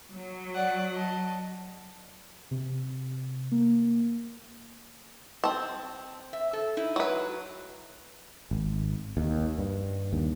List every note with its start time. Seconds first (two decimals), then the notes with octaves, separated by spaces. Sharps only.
0.12 F#3
0.54 D5 F#5
0.93 D#5 A5
2.51 C3
3.52 A#3
5.44 C4 A5
6.33 E5
6.53 A4
6.77 D#4 E4
6.96 F#3 B4
8.51 G#1
9.17 D#2
9.58 G2
10.13 D#2